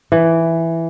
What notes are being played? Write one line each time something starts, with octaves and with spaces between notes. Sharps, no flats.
E3